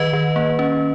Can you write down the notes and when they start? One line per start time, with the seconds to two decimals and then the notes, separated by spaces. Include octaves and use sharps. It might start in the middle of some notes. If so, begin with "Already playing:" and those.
Already playing: D#3 B4 D#5
0.13 D#3
0.36 A#3
0.59 C#4